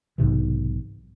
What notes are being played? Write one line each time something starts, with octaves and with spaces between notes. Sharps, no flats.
B1 G#2 C3 E3